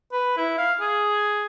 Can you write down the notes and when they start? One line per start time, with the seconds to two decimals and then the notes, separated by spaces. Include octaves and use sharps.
0.12 B4
0.37 E4
0.58 F5
0.81 G#4